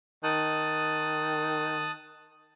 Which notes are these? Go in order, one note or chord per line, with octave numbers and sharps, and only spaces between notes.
D#3 A5 D#6 F#6